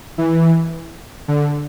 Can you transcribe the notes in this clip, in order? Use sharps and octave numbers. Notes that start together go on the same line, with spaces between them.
E3
D3